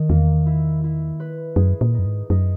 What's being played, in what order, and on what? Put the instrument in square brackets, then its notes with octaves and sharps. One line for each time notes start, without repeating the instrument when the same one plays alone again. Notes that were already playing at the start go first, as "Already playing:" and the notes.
Already playing: [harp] D#3
[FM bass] E2 [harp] A#3
[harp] E4
E4
B4
[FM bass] F#2 [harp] G#4
[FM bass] A#2
[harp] D#4
[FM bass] F#2
G#2
[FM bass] F#2 [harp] D#4